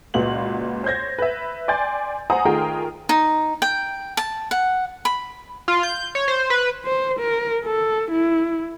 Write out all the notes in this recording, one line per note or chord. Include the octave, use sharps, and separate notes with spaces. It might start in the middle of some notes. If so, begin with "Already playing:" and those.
C#2 A#2 F#4 B4 F5 F#7
C5 C#5 G6 G#6 A#6
B4 E5
D5 G5 G#5 C6 G6 A6
C5 F#5 G#5 A#5 D#6
D#3 A3 F4 G#4 A#4 G5
D#4
G5
A5
F#5
B5
F4
G6
C#5
C5
B4
C5
A#4
A4
E4